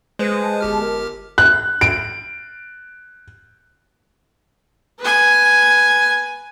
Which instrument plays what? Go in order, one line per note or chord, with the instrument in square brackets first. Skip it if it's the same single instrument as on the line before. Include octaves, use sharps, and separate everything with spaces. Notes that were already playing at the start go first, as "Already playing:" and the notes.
[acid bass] G#3 [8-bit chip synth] B4 C5
[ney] A5
[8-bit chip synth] G1 G4 F6
[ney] A#4
[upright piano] F#6
D7
[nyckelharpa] B4 G#5